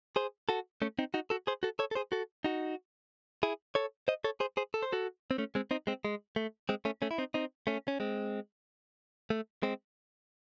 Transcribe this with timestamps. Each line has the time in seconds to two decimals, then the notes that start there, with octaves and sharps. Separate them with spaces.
0.16 G#4 C5
0.49 F#4 A4
0.82 A3 C#4
0.99 C4 D#4
1.14 D#4 F#4
1.30 F#4 A4
1.47 G#4 C5
1.63 F#4 A4
1.79 A4 C#5
1.91 A4
1.95 G#4 C5
2.12 F#4 A4
2.44 D#4 F#4
3.43 E4 G#4
3.75 A4 C#5
4.08 C5 D#5
4.24 A4 C#5
4.40 G#4 C5
4.57 G#4 C5
4.74 A4
4.83 C5
4.92 F#4 A4
5.31 C4
5.38 A3 C#4
5.55 G#3 C4
5.71 C4 D#4
5.87 G#3 C4
6.05 G#3
6.36 A3
6.69 G#3 C4
6.85 A3 C#4
7.02 A3 C#4
7.11 E4
7.18 C4 D#4
7.34 C4 D#4
7.67 A3 C#4
7.88 C#4
8.00 G#3 C4
9.30 A3
9.63 G#3 C4